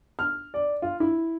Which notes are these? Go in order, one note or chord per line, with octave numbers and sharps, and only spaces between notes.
F6
D5
F4
E4